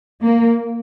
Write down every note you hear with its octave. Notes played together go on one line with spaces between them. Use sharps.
A#3